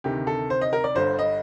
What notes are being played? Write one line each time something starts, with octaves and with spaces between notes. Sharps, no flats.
D2 C3 D#3 G4
A4
C5
D#5
A#4
D5
G1 G2 D3 C5
D#5